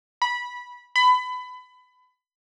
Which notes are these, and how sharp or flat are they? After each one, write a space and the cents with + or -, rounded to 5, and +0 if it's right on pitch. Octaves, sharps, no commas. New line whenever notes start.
B5 -15
B5 +25